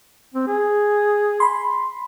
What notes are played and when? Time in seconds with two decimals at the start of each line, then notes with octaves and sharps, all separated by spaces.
0.34 C4
0.47 G#4
1.40 B5 C6